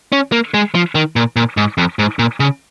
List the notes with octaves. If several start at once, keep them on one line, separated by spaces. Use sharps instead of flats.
C#4
A#3
G#3
F3
D#3
A#2
A#2
G#2
F2
G#2
A#2
C#3